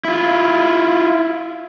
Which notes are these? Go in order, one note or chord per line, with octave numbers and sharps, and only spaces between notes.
E4 F4